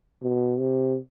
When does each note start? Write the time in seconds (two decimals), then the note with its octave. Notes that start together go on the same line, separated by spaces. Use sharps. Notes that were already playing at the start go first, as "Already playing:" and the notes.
0.23 B2
0.59 C3